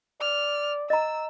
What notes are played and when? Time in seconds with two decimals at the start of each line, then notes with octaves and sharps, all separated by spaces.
0.21 D5 F6
0.90 D#5 A#5 E6